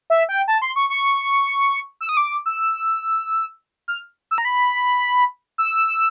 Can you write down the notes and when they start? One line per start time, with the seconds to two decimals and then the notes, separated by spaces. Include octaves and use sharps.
0.10 E5
0.29 G5
0.48 A5
0.62 C6
0.76 C#6
0.90 C#6
2.01 E6
2.09 D#6
2.17 D6
2.46 E6
3.88 F6
4.31 E6
4.38 A#5
4.45 B5
5.58 E6